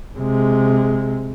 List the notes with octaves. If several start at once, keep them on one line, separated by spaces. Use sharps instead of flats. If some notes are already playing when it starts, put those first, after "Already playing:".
C3 G#3